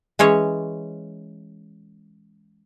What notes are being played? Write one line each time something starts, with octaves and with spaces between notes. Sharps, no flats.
E3 G#3 C#4 C#5